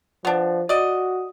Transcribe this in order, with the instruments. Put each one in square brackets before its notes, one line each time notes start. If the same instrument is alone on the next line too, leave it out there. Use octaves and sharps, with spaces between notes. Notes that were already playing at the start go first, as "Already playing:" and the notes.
[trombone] F3 [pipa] B3 D4
[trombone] F#4 [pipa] D5 D#5